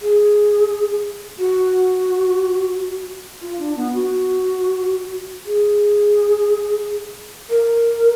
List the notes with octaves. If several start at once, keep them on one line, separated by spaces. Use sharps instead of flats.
G#4
F#4
F4
D4
B3
F#4
G#4
A#4